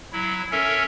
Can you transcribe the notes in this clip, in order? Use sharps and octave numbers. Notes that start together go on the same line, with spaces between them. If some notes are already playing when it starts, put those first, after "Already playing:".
F#3 E4
C#4 A4 A#4 C#5 E5